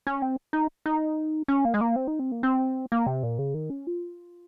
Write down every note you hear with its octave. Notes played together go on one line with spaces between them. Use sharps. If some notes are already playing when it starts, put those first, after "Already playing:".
C#4
C4
D#4
D#4
C#4
A#3
G#3
A#3
C4
D#4
C4
A#3
C4
A#3
C3
A#2
C#3
D#3
C#4
F4